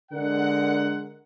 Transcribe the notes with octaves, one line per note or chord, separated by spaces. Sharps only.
D3 G#3 A#4 F#5